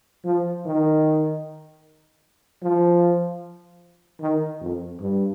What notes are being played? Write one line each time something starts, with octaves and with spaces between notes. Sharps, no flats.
F3
D#3
F3
D#3
F2
G2